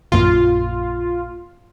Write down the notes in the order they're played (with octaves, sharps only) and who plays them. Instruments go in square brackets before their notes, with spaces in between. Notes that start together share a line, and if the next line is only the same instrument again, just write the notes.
[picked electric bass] A#1 F#2 A#3 [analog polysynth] F4